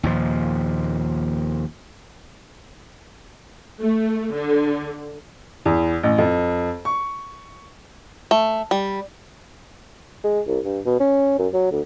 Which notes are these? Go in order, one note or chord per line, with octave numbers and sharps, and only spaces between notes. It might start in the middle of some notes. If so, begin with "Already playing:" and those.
D#2 A#2 F3
A3
D3
E2
A1
F2
C#6
A3
G3
G#3
C2
G2
B2
C#4
F#2
F#3
D2